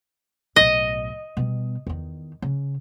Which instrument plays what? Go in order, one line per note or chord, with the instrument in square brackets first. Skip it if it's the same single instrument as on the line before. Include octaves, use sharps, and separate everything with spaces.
[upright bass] B1 A2 [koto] D#5
[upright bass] B2 G3
E2 D#3
C#3